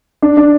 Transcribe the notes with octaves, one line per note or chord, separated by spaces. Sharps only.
D4
D4